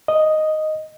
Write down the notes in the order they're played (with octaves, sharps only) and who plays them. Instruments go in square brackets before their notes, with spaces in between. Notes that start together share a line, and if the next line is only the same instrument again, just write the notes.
[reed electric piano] D#5